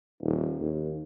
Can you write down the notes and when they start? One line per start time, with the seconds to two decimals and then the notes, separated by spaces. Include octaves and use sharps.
0.22 D#1
0.60 D#2